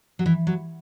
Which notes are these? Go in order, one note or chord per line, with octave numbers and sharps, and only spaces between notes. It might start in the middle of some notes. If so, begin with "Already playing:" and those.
F#3
E3
F#3